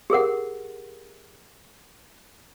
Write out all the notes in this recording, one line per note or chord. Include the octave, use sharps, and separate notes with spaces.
G4 G#4 A#4 F#5